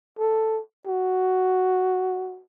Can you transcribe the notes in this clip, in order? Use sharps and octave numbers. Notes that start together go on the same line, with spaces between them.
A4
F#4